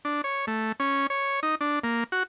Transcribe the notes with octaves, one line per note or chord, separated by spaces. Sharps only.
D4
C#5
A3
C#4
C#5
D#4
D4
A#3
F#4